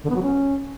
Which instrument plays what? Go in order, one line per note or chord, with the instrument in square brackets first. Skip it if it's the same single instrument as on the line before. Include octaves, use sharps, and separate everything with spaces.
[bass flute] D3
B3
F#3
C#4